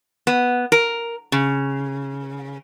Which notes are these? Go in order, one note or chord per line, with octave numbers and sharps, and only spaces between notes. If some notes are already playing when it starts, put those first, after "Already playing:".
B3
A#4
C#3